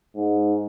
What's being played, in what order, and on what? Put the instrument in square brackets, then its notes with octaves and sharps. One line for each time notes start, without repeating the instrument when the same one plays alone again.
[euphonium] G#2